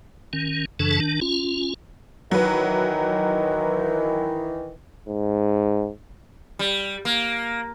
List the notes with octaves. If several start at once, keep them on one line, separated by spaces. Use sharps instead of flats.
D#3 C#4
F#2 C#3 E3 D4 A4 A5
D#3 D4
C#4 F4
D#3 E3 F#3 B4
G#2
G3
A#3